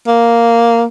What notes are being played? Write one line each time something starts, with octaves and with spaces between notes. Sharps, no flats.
A#3